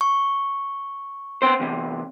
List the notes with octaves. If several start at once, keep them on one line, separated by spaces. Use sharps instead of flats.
C#6
B3 C4 C5
E2 C3